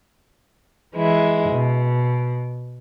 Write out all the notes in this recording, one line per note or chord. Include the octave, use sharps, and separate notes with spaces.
E3 G#3 E4
B2